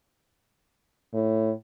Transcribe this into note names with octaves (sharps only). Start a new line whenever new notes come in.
A2